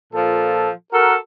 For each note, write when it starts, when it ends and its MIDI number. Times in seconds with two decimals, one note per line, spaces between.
0.13 0.69 46
0.13 0.69 53
0.13 0.69 69
0.93 1.14 66
0.93 1.14 69
0.93 1.14 70